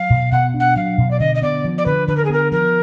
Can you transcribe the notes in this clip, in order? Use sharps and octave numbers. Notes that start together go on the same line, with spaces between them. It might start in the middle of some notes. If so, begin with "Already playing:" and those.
Already playing: F#3 F5
B2
B2 F#5
D4
F#5
F#3 F5
B2
D5
D3 D#5
D#5
B3 D5
F3
D5
D3 B4
D3 B4
A#4
G#4
B3 A#4
F3 A#4